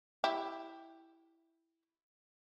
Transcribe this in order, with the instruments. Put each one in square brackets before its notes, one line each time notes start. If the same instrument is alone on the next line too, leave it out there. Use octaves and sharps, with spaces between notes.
[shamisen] E4 G4